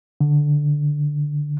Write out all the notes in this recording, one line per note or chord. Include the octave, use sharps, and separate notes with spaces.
D3